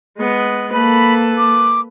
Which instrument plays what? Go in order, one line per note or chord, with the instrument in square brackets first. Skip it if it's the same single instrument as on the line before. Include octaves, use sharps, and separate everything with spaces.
[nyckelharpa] G#3 B3
[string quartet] A#3 A4 [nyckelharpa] B4 [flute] B5
[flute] D6